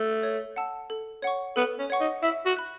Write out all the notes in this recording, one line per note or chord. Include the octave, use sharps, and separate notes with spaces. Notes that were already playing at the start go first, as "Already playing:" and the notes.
Already playing: A3
C#5
F#5 A5 E6
A4
C#5 F#5 C#6
B3 A4
C#4
C#5 F#5 C#6
D#4
E4 E5
F#4
B5 F#6